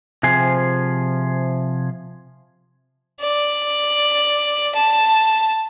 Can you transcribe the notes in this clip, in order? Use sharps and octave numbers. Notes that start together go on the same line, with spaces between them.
C3 F3 G#4
D5
A5